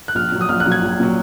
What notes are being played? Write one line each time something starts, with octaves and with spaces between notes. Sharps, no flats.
F#6
A#1 F6
A#2 F#3
D#6
A#1 F6
F#6
A#2 F#3
G#6
A#1
A#2 F#3